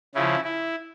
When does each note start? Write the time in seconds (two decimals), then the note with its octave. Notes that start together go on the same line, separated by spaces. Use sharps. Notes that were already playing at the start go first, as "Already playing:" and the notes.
0.15 C#3 F3 E4
0.44 E4